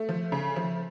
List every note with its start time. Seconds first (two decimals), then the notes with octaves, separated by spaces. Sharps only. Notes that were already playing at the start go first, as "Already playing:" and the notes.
Already playing: A3
0.09 F3
0.32 C#3
0.56 F3